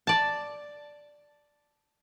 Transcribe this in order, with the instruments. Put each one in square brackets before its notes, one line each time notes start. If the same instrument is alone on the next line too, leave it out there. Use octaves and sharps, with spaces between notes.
[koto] D5 A5